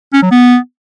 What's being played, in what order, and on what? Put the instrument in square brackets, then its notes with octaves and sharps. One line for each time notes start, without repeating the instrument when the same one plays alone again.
[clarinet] C#4
F#3
B3